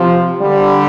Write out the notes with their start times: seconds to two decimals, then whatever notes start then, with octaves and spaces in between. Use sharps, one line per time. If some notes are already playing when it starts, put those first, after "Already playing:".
Already playing: C3 F3
0.40 D3 G3